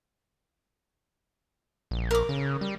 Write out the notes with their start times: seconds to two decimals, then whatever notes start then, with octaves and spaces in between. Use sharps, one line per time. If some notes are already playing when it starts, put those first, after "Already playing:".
1.91 A#1
2.11 A#4 D6
2.29 C#3
2.61 G3